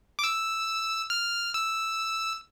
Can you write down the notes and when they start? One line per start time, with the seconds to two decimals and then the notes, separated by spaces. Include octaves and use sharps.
0.19 D6
0.24 E6
1.10 F6
1.54 E6